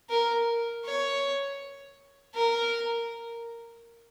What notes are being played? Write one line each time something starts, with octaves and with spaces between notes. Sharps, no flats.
A#4
C#5
A#4